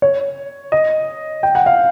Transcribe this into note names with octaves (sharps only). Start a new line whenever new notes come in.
C#5
D#5
G5
F#5
F5